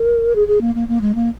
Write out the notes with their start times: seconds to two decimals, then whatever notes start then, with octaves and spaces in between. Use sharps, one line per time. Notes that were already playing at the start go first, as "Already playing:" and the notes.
Already playing: A#4
0.35 G#4
0.48 G#4
0.61 A#3
0.75 A#3
0.88 A#3
1.01 G#3
1.15 A#3